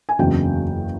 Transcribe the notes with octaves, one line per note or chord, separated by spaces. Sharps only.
G#5
F#1 E2 C#3 F#3 G5